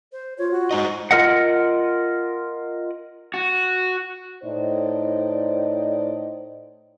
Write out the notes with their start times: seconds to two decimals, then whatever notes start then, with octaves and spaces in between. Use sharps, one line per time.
0.12 C5
0.38 F4 C#5
0.51 F#4
0.71 G#3 D#4 C5 D#5
1.11 F4 A#4 D#5 F#5
3.34 F#4
4.43 A2 D#4 C5 D5 D#5